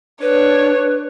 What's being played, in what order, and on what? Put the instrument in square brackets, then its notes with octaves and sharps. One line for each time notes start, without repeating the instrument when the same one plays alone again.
[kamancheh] D4 C#5 [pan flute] B4